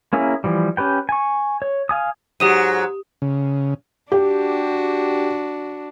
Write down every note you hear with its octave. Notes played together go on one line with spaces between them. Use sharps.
A#3 C#4 E4 G#4 A#4
E3 F3 G3
C#4 G4 B4 G5
G#5 C#6
C#5
F5 G#5 D#6
G#2 F#3 G4 D#6 D#7
C#3
D4 F#4 G4